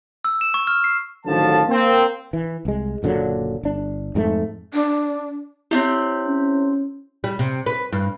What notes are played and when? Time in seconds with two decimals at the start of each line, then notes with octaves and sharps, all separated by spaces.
0.24 E6
0.41 E7
0.54 C#6
0.67 F6
0.84 C7
1.25 A1 D3 D#3 F3 F#3 A5
1.69 A#3 C4
2.33 E3
2.65 C2 G#3
3.03 F#1 A#2 D3 F#3
3.63 G1 D4
4.15 F2 G#2 G#3 A3
4.74 D4
5.71 C4 D4 E4 G4 C#5
6.27 C#4
7.24 G3
7.39 C3
7.66 B4
7.92 G2